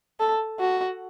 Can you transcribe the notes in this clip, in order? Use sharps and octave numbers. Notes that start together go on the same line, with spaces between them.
A4
F#4